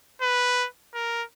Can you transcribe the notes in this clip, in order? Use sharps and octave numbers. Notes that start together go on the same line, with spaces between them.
B4
A#4